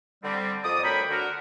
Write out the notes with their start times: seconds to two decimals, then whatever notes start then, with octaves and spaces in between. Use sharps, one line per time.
0.23 D3 G3 C4
0.63 F2 D#3 D5 D#6
0.84 D2 A#4 C#5 G5 B5
1.10 D3 F#4 A#4